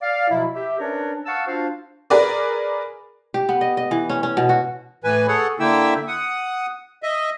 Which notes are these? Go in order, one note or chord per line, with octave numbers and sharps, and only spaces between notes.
D5 F5
B2 F3 F#3 E4
G4 E5
C#4 D4 A#4 B4 C#5 D5
F5 F#5 A5 C#6 E6
D4 F4 F#4 C5 F5
G#4 A#4 B4 D5
G4
B3
D#5
D#5
E3
C#4
C#4
B2
F#4
A2 E3 B4 G#5
G#4 A4 C#5 F#5
D3 A#3 E4 E5 G5 E6
F#5 D#6
D#5 E5